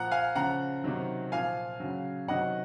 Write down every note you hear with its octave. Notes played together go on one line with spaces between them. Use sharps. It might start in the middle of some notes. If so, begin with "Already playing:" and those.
Already playing: A#2 F3 F#5 A#5
F5 G#5
C#3 F3 F#5 A#5
C3 D#3 F#3
A#2 F3 F5 G#5
C#3 F#3
C3 D#3 F#3 D#5 F#5